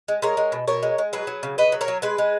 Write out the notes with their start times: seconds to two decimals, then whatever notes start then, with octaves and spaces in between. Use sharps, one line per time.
0.08 G#3
0.22 G#3 A#4 C#5
0.37 G#3
0.52 B2
0.68 B2 A#4 C#5
0.83 G#3
0.98 G#3
1.13 F#3 G#4 B4
1.27 F#3
1.43 C#3
1.58 C#3 B4 D#5
1.72 F#3
1.81 A#4 C#5
1.88 F#3
2.02 G#3 G#4 B4
2.18 G#3